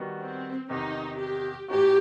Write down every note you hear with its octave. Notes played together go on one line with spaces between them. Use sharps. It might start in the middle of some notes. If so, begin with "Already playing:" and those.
Already playing: D#3 G3 B3 F#4
C4
E2 C3 D#3 D#4
G4
A2 E3 B3 D#4 F#4 G4